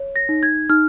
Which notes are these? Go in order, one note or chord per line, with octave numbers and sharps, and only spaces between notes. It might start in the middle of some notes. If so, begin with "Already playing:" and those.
Already playing: C#5
A#6
D#4
G#6
D#4 F6